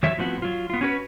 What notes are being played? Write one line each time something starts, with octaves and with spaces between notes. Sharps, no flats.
D#3 F#3 C#5 E5
A2 F3 B3 C4 E4 F#4
F#3 F4
B3 F4
C#4 F#4 B4